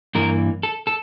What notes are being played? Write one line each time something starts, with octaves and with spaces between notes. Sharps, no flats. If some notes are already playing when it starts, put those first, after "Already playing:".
G2 E3 A#3 A#4
A4
A4